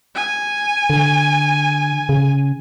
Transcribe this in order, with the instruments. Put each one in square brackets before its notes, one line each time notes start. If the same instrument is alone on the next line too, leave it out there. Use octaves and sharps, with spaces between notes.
[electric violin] G#5
[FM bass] D3
C#3